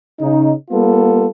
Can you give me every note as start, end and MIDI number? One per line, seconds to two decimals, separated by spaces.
0.21 0.53 49
0.21 0.53 63
0.71 1.26 55
0.71 1.26 58
0.71 1.26 59
0.71 1.26 65
0.71 1.26 69